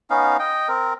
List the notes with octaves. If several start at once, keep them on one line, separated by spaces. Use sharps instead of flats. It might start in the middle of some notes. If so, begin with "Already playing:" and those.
B3 C#4 D#4 F5
D#5 G5
C4 A#4